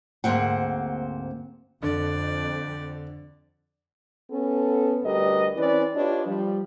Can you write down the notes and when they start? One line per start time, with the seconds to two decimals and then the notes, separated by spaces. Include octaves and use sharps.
0.24 D2 G#2 G#3 A#3 C4 F#5
1.83 F2 D3 D5
4.31 B3 C#4 A4
5.04 D2 G3 G4 A#4 B4 D#5
5.57 E3 C4 C#4 E4 B4 D5
5.95 D4 F4 G4 B4 C#5 D#5
6.27 F3 G3